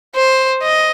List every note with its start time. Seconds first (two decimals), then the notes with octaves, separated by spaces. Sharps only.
0.16 C5
0.63 D#5